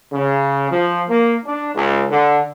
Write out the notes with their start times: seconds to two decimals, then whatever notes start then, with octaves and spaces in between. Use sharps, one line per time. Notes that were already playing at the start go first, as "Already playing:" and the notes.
0.12 C#3
0.71 F3
1.09 A#3
1.46 D4
1.75 C#2
2.10 D3